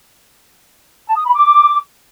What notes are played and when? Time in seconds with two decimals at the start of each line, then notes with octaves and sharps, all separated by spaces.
1.06 A5
1.15 D#6
1.24 B5
1.33 D6